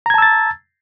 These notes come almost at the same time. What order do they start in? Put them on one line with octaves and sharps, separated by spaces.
A#5 G#6 A5 E6 A6